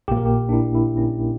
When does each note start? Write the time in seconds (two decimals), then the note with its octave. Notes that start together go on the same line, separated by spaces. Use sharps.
0.08 A#1 A#2 A#3 G4
0.17 A#4
0.26 G4
0.49 D4
0.52 E4
0.75 E4
0.97 C#4